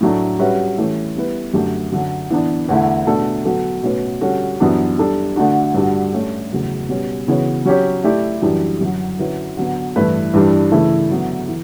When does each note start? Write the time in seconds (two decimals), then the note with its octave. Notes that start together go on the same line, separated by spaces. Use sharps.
0.01 A2 F#3 A3 D4
0.39 G3 C#4 F#4 B4 E5
0.78 E3 A3 C#4 G4
1.16 G3 B3 E4 B4
1.54 F#2 D3 A3 D4 G4
1.92 F#2 D3 F#3
2.30 E3 B3 D4
2.69 E2 D3 A3 E4
3.07 B2 A3 D4 A4
3.45 D3 F#3 B3 F#4 A4
3.83 B2 A3 C#4 F#4 B4
4.21 D3 G3 C#4 F#4 A4
4.60 F#2 E3 B3 D4 G4
4.98 G3 D4 A4
5.36 D3 A3 D4 F#4
5.74 G2 D3 G3 D4 F#4
6.13 A3 C#4 G4
6.51 E2 C#3 F#3 A3
6.89 B2 G3 C#4
7.28 C#3 E3 B3 F#4 C#5
7.65 F#3 C#4 G4 C#5
8.04 A3 E4 G4 D5
8.42 F#2 E3 G3 D4
8.81 F#2 D3 F#3
9.19 D3 F#3 C#4 E4 B4
9.57 D3 F#3 B3
9.96 G2 E3 A3 E4 B4
10.33 G2 E3 G3 D4
10.72 C#3 E3 A3 E4 A4
11.10 D3 F#3 B3 E4
11.48 E3